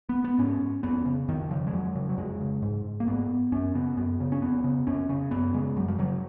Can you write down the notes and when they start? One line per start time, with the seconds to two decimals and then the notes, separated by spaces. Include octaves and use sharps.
0.09 B3
0.24 B3
0.39 G#2 C#4
0.83 F2 B3
1.05 C#3
1.28 F2 D#3
1.51 C#3 F3
1.67 G#3
1.73 F2 F#3
1.96 C#3
2.09 F#3
2.17 F2 G#3
2.41 C#3
2.62 G#2
3.00 A#3
3.08 G#2 B3
3.52 F#2 C#4
3.74 C#3 B3
3.97 F#2 B3
4.20 C#3
4.32 C#4
4.42 F2 B3
4.64 C#3
4.87 F2 C#4
5.09 C#3 C#4
5.31 F#2 B3
5.54 C#3 G#3
5.76 F#2 F#3
5.88 F3
5.99 C#3 F#3